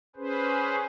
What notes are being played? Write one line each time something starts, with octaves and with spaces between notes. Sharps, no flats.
C#4 G#4 B4 C5